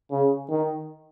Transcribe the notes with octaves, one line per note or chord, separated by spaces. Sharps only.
C#3
D#3